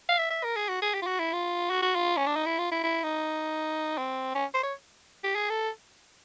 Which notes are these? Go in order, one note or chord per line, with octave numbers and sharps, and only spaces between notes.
F5
E5
E5
A#4
G#4
F#4
G#4
G4
F4
F#4
E4
F4
F#4
F#4
F4
C#4
D4
D#4
E4
F4
E4
E4
D#4
C4
C#4
C5
C#5
G4
G#4
A4